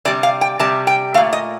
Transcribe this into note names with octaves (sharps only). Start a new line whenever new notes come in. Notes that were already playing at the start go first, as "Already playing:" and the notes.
C3 G3 D5
F5
G5
C3 G3 A5
G5
A#2 A3 F5
D#5